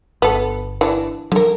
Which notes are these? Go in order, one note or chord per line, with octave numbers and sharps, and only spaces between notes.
G1 B3 A4
E3 D4
D3 F#3 A#4